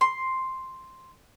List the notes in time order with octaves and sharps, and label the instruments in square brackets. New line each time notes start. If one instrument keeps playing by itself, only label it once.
[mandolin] C6